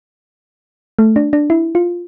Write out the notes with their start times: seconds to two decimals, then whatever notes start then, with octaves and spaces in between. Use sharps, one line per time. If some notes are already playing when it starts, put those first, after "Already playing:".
0.99 A3
1.16 D4
1.33 D4
1.50 E4
1.75 F4